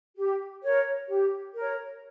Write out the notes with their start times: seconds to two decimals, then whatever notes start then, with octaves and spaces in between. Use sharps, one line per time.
0.16 G4
0.62 A#4 C#5
1.08 G4
1.55 A#4 C#5